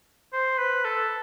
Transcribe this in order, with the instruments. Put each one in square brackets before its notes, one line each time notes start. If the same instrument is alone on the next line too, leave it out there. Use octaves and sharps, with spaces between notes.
[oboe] C5
B4
A4